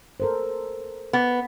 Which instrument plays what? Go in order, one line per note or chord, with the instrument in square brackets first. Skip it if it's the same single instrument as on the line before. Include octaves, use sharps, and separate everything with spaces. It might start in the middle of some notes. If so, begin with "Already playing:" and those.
[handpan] A4 A#4 C5
[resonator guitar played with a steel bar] B3